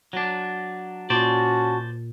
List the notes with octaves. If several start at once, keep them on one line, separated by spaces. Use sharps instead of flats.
F#3 D4
A#2 C#4 F#4 C5 D5 A5